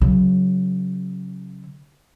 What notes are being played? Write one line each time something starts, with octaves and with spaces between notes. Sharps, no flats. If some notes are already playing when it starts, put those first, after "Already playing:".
C#3 F#3